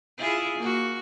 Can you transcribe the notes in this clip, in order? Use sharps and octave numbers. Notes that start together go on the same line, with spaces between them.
E4 F4 G#4
A#3 F#4